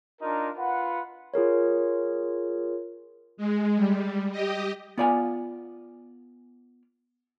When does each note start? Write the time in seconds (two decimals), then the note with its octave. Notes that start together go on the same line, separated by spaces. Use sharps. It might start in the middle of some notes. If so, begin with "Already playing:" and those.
0.22 D4 D#4 F4 A#4
0.58 F4 B4 F#5
1.34 F4 G#4 A#4 C#5
3.37 G#3
3.77 G3
4.31 G4 D#5
4.98 B3 F4 D5 F5 G#5